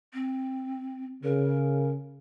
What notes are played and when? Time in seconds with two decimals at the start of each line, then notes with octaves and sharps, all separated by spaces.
0.14 C4
1.24 C#3 A#4